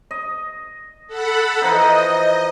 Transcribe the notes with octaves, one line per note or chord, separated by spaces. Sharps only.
D#5
A4 F#5 B5
E3 F3 D#4 D#5